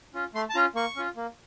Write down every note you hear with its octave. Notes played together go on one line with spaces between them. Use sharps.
C#4 F4
A3 C6
A5
C#4 F4 A#5
A#3 C#6
C#4 F4
A#3